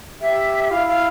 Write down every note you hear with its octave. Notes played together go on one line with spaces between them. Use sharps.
G4 E5
E4 F5
F5